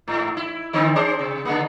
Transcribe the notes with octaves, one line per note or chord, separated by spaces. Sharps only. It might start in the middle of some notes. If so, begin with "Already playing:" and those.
G#2
E4
D3 D#3 C4
C#4 G#4 C5
C3
C#3 G#3 A#3